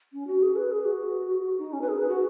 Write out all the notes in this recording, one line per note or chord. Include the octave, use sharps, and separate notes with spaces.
C#4
F#4
G#4
B4
G#4
F#4
D#4
C#4
B4
G#4
B4
F#4